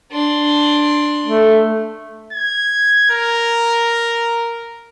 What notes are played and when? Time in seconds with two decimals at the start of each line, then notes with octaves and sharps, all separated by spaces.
0.11 D4 C6
1.27 A3
2.33 G#6
3.10 A#4